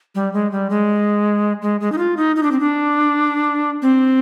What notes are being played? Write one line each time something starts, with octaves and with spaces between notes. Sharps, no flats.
G3
G#3
G3
G#3
G#3
G#3
D#4
F4
D#4
D#4
D4
C4
D4
C4